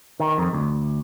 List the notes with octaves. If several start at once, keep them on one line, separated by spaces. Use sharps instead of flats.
D#3
F2
D2